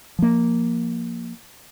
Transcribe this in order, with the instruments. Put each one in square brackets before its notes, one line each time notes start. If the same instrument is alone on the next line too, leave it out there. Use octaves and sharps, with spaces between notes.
[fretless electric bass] F3 A#3